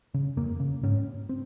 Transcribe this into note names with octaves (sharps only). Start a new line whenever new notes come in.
C#3
F2 A#3
C#3
G#2 C#4
C4